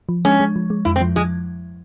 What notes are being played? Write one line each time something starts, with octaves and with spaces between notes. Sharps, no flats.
F3
G#3 C#4
G#3
F3
G#3
F2 E4
C4
F3
F3 G#3